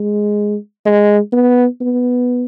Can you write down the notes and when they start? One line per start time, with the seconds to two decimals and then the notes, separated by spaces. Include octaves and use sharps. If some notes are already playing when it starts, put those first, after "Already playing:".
Already playing: G#3
0.86 G#3
1.33 B3
1.81 B3